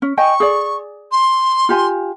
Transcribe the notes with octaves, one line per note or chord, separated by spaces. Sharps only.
C#4
D#5 G5 G#5 C#6
G#4 D5
C6
F4 G4 G#5